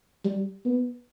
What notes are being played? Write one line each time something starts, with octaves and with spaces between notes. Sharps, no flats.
G3
B3